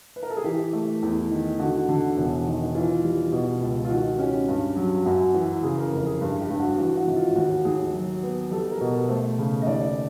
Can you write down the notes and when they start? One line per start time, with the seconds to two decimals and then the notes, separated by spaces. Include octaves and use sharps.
0.16 B4
0.23 A#4
0.30 A4
0.37 G#4
0.44 E3 G4
0.73 A3
1.03 E2
1.30 D#3
1.59 D3 F#4
1.89 D3
2.17 E1
2.47 D#3
2.75 E3 F4
3.04 G3
3.32 B2
3.61 C#2
3.85 F4
3.90 D#3 F#4
4.19 C#4 G4
4.48 G2
4.76 F#3
5.05 F#2 F#4
5.34 E3 F#4
5.63 C#3 G#4
5.77 A#4
5.92 F1
6.06 G#4
6.21 G2 G#4
6.41 G4
6.50 G2
6.60 F#4
6.78 E3 F#4
6.97 F#4
7.08 G#1
7.16 F4
7.36 D#2 F#4
7.65 D#2 G#4
7.93 F#3
8.23 B3
8.51 G3 A4
8.71 A#4
8.81 B2
8.90 B4
9.09 A3 C5
9.39 C#3
9.62 D#5
9.66 D#2 D5